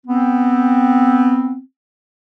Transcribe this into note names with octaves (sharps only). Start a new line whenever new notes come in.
B3 C4